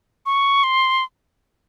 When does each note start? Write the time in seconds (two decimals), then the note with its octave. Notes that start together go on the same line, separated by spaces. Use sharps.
0.26 C#6
0.64 C6